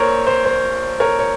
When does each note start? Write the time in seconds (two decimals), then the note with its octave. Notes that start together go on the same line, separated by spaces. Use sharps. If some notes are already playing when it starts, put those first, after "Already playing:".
Already playing: A#1 A#2 A#4 C5 C#5
0.27 C5
0.45 C5
1.00 A#4 C#5
1.19 C#5